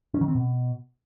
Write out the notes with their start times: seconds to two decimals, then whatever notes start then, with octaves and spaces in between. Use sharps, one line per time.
0.14 C#4
0.21 D#3
0.28 C4
0.35 B2